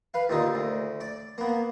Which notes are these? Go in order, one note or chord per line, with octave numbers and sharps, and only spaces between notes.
B4 F5
D#2 A#2 D3 D#4
D2
D5
A#3 B3